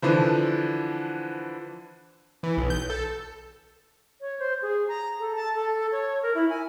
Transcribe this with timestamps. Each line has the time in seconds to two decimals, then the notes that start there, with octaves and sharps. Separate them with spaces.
0.02 D3 E3 F3
2.43 E3
2.57 B1
2.70 G6
2.90 A4
4.21 C#5
4.39 C5
4.62 G#4
4.88 A#5
5.20 A4
5.36 A5
5.55 A4
5.92 C#5
6.22 A#4
6.35 E4
6.49 G#5